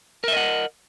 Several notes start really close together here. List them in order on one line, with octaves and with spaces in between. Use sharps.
A#4 E5 D#5 F#5